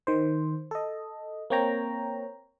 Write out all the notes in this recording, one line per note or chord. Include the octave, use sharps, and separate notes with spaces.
D#3 C5
A4 D#5
A#3 C4 C#5 G5 A#5